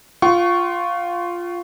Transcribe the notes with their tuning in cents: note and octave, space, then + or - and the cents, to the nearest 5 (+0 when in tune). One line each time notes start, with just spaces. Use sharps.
F4 +0 F#5 +45 C#6 +0